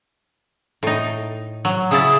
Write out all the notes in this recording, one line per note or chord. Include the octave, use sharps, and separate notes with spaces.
A2 D#4
F#3
C#3 E4 A5 D#6